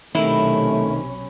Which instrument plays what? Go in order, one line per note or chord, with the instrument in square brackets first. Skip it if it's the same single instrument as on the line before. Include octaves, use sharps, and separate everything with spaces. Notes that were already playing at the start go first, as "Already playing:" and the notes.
[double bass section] B1 C3 C#4 [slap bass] D#3 [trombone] A3 [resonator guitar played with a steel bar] E4